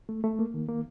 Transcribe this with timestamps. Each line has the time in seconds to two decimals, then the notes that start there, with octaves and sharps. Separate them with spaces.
0.09 A3
0.24 A3
0.39 A#3
0.54 D#3
0.69 A#3